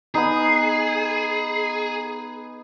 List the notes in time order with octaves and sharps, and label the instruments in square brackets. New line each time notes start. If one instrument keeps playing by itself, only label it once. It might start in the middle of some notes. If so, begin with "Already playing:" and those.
[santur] B3 D#4 [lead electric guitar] G#4